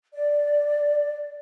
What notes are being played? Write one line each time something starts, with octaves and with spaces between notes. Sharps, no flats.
D5